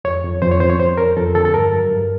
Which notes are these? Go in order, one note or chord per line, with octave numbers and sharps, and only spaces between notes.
F2 C#5
F2
F2 C5
C#5
F2 C5
C#5
F2 C5
F2 A#4
F2 A4
D3 A4
A4
G2 A#4
F#3
G2